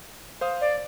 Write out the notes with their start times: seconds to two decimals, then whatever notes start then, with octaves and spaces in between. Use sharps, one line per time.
0.41 C5 F5 D#6
0.61 D5